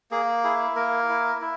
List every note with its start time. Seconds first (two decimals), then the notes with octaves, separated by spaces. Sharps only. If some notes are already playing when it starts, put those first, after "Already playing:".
0.11 A#3 G#4
0.44 E4 G#4
0.76 A#3 A#4
1.10 E4
1.41 E4